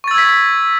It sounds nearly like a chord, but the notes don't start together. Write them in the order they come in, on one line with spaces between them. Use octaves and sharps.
C#6 A6 E6 G#6 B6